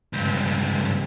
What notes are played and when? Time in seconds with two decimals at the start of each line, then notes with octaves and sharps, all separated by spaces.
0.13 C#2 G2